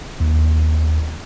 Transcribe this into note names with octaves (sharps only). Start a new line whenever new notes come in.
D#2